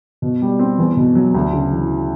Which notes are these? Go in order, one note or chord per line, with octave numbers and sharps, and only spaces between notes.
B2
G3
C4
E2
B2
F#3
D2
C#3
E3